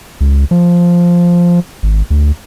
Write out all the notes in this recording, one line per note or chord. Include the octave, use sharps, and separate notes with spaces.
C#2
F3
G#1
D2